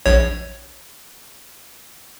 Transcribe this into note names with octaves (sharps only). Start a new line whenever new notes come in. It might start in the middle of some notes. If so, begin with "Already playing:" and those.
A#1 C#5